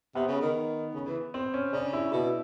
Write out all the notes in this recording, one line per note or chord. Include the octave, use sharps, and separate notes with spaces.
C3 B3
C#3
D#3
C#3
E3
C4
C#4
C#3 D4
E4
B2 E4